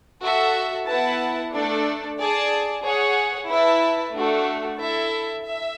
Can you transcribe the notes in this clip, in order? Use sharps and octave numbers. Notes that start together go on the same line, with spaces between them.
F#4 A4 E5
B3 E4 B4 F#5 A5
A3 D4 A4 D5
G#4 D5 A5
G#4 C#5 F#5
E4 B4 E5 A5
A3 D4 F#4
E4 A4 E5
E5